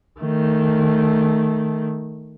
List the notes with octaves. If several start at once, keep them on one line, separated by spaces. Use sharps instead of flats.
D#3 A3